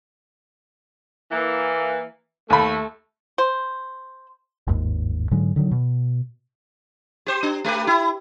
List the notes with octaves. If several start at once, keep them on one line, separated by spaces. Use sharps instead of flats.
E3 A#3
D#2 A3 B5
C5
G1 D#2 G#2
G#2 D3 F#3 G#3
D3 D#3 F#3
B2
G4 C5
D4
A3 G4 B4
E4